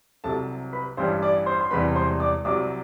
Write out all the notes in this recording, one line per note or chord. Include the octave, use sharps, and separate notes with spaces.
C2 C3 F#3 A4 A5
B4 B5
A1 G2 E3 G3 C5 C6
D5 D6
C5 C6
C6
E1 E2 C3 E3 G3 B4 B5
C5 C6
D5 D6
C2 C3 F#3 D5 D6